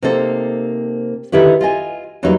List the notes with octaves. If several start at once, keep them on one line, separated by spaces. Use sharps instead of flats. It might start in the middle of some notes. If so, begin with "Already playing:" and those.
C3 A#3 D#4 A4 C5
D3 D#3 E4 G4 B4
F4 D#5 G#5
E2 E3 F#3 G3 A#3 D#4